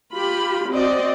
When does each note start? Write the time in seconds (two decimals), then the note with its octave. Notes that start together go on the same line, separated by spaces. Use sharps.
0.14 F4 G4 B5
0.71 C4 F#4 D5 D#5